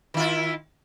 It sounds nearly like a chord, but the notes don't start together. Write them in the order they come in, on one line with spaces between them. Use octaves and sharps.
D#3 E4 F4